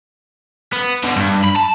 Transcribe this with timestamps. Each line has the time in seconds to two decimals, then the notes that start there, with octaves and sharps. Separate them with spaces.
0.73 B3
1.04 B2 D3
1.16 G2
1.44 B5
1.56 A5